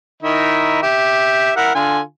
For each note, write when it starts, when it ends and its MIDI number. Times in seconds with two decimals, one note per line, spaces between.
0.22 0.82 51
0.22 0.82 63
0.22 0.82 64
0.83 1.52 67
0.83 1.52 76
1.56 1.75 64
1.56 1.75 70
1.56 1.75 78
1.75 2.00 50
1.75 2.00 65
1.75 2.00 80